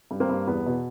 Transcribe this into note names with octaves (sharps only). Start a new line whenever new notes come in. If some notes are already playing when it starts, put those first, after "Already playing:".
G2
A#3 C4
G2
E2 B3
B2